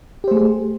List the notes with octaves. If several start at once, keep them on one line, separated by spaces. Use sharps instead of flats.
A3 G4 G#4 C5